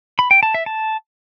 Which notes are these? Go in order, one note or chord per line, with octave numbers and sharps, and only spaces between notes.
B5
G5
A5
E5
A5